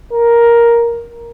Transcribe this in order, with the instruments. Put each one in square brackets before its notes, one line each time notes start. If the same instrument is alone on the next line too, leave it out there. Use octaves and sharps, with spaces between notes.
[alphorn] A#4